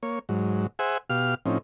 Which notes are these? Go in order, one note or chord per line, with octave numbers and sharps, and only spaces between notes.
A#3 C#5
G#2 F#3
G#4 C5 E5 F#5 G#5
B2 G4 F5 F6
A2 F3 C4 C#4 D#4